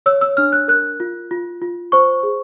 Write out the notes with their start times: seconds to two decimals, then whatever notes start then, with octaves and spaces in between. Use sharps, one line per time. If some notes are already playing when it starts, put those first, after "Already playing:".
0.06 C#5 E6
0.21 E6
0.37 D4 F6
0.52 F#6
0.68 A#4 F#6
1.00 F4
1.31 F4
1.62 F4
1.92 C5 C#6
2.23 G#4